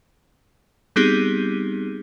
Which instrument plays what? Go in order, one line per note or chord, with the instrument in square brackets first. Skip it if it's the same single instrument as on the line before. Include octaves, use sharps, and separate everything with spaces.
[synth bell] G3 B3 C4 D#4 G4 G#4